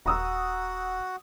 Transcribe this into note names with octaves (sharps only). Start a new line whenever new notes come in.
D#1 F#4 F#5 A#5 D#6 E6